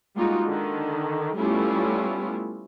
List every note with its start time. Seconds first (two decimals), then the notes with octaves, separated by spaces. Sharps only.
0.15 G3 G#3 A#3 D#4 F4 F#4
0.46 D3 D#3
1.37 G3 A3 B3 C#4 E4 F4